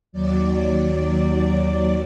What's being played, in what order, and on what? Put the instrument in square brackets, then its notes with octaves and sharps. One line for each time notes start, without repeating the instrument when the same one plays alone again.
[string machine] D#2 F#3 D5